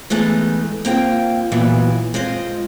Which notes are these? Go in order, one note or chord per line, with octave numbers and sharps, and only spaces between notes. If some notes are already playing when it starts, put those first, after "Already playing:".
E3 G#3 A3 B3 D#4
A#3 C4 F4 G5
A#2 E3 F#3 B3
G#3 C4 F4 D#5